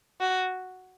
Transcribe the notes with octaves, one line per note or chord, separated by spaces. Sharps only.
F#4